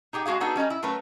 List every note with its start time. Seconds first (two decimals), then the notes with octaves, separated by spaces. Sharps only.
0.13 D#4 G4 G#4 G5
0.26 G#3 E4 F#4 G#4 F5
0.40 B3 D4 D#4 F#4 G#4 A4
0.56 G3 C#4 D#5 A#5
0.70 E4
0.83 F#3 A3 C#4 A#4 B4